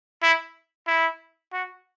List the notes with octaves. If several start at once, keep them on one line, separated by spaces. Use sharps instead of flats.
E4
E4
F#4